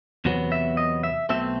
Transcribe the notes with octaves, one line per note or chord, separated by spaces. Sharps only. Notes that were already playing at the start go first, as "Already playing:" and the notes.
E2 C3 F#3 B3
E5
D#5
E5
B1 B2 A3 C4 E5